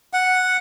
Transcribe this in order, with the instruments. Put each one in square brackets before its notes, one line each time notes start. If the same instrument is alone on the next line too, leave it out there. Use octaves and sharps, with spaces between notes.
[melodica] F#5